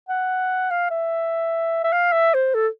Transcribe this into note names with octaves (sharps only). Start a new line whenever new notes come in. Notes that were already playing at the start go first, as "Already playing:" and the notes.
F#5
F5
E5
E5
F5
E5
C5
A4